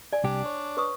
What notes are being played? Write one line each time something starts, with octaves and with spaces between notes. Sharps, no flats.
D5 G#5
C2 D4 G4
C#5
B4 C#6 D#6